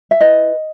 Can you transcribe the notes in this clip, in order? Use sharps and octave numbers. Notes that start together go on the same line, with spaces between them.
E5
E4 B4 D#5